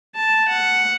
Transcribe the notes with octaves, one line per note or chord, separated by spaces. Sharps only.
A5
F#5